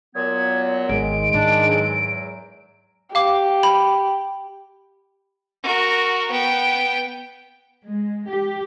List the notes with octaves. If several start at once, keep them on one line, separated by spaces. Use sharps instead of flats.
A#2 F#3 B3 G#6
G#1 D#3 G#3 D7
G#2 D4 E4
E2 F#3
G4 F5 D6
B5
F#4 A#4
B3 G5
G#3
G4